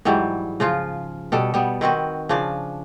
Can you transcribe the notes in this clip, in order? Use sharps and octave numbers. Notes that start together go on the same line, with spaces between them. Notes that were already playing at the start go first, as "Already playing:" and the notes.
G#2 E3 F#3 G3
C#3 F3 F4
B2 G3 A4
G3 B3
D#3 C4 F#4 B4
C#3 F3 D4